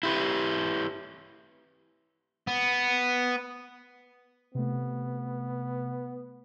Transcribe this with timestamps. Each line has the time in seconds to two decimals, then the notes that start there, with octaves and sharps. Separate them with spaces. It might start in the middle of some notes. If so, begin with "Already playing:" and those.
0.03 E4 G4 B4
2.47 B3
4.55 C3 A3 B3